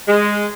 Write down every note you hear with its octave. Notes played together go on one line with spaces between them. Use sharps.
G#3